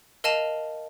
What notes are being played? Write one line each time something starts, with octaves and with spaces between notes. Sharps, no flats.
A#4 D#5 F5 A5 D#7 F7